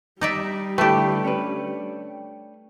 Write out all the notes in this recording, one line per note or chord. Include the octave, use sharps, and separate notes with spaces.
G3 D#4 D5 E5
D3 A3 E4 G4 B4 G5
C#4 D4 B4